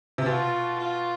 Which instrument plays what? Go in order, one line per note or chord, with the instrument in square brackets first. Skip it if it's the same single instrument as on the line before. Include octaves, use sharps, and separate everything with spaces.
[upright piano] C3
[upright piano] B2 [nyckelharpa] F4
[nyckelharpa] F4